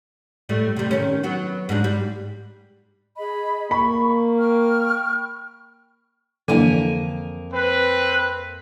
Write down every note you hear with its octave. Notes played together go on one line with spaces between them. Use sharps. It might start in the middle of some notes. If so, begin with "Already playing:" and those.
A2 G3 A3
C3 G3
D#3 C#4
F#3 B3 F#4
G#2 G#3 D4
G3
G#4 D#5 B5
A#3 B5 C#6
G5 C#6 F6
F2 D3 E3 A#3 G#5
C4 B4